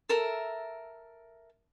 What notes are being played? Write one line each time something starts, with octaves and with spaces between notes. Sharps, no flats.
A4 A#4 E5